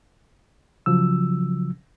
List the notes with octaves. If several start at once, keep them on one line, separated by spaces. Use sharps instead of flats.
C#3 F3 F#3 E6